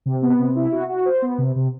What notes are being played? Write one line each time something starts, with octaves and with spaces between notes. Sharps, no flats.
C3
B3
C3
E4
F#4
F#4
C5
B3
C3
C3